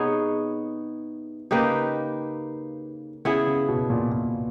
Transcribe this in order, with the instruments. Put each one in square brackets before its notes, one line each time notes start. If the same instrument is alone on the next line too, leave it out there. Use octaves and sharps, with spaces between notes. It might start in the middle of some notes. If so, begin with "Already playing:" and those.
Already playing: [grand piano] C3 [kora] B3 D#4 G#4 C#5
[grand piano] C#3 [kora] A#3 D#4 G4 B4
[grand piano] C#3 [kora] B3 E4 G#4
[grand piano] C#3
B2
A#2
A#2